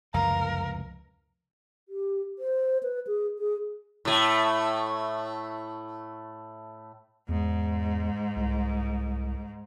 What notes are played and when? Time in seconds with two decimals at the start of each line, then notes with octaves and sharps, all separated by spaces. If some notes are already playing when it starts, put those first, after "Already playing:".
0.14 F1 C#2 F#2 E3 A#4 F5 A#5
1.89 G4
2.39 C5
2.83 B4
3.07 G#4
3.39 G#4
4.05 A2 A3
7.29 E2 G#2
8.36 C2